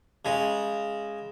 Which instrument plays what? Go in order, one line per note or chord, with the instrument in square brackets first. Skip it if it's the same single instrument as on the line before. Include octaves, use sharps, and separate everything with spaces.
[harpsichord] C#3 G#3